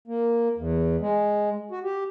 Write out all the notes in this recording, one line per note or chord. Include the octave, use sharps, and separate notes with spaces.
A#3
E2
G#3
F#4
G4